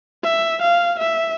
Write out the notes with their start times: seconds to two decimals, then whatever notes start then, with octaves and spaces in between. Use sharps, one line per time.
0.24 E5
0.61 F5
0.99 E5